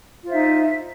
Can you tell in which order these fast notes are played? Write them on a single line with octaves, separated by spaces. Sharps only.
F4 C5 E5 D#4